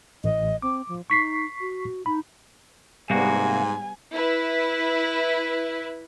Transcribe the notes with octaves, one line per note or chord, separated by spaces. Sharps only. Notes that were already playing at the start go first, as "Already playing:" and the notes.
A1 D#5
C4 D6
F3
D#4 C#6 B6 C7
F#4
D#4 B5
G#2 C3 G3 A#3 B3 F#4 G#5
E4 B4